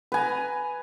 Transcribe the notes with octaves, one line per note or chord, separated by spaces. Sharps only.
B4 G#5 A#5